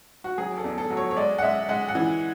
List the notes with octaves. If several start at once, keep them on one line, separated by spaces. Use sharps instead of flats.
F#4
F#3 G#4
A4
E2
A4
F#3
C#5
C#5
G#3 D5
F#5
G#3 E5
G#3 F#5
F#5
E3